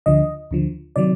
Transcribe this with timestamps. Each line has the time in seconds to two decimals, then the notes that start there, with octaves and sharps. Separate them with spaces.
0.06 D2 D3 F3 D#5
0.51 D2 D3 F3
0.96 C3 D#3 F#3 D5